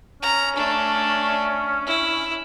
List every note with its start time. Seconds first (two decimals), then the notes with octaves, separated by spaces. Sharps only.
0.23 C#4 A#5
0.56 A3 D4
1.87 E4